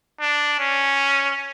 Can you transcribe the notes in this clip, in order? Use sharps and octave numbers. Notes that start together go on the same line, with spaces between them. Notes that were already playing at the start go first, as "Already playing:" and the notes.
D4
C#4